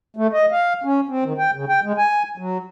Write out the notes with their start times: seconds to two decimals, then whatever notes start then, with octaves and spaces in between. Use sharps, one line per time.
0.16 A3
0.33 D#5
0.52 F5
0.84 C#4
1.09 C4
1.24 D#3
1.38 G5
1.54 C#3
1.69 G5
1.84 G#3
1.98 G#5
2.38 F#3